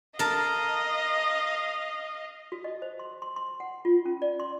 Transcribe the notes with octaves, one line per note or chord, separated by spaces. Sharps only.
A#4 D#5 F5 A5
F#4
D#5
C5
C6
C6
C6
F#5
F4
C#4
D5
C6